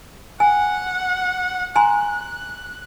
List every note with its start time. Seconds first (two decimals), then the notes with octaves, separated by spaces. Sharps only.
0.40 F#5 G#5
1.76 G#5 A#5 C6 F#6